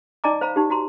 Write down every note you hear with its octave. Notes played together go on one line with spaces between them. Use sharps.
D#4 D5 D#5 G#5 A#5 D6
C5 F5 A#5 B5
D#4 G4
F#4 A#5 C6